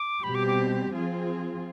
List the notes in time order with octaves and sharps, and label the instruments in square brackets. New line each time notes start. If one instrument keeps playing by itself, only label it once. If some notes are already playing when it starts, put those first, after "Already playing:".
Already playing: [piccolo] D6
[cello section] B2 G3 C4 G4 [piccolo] B5
[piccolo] D6
D6
[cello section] F3 C4 F4 G#4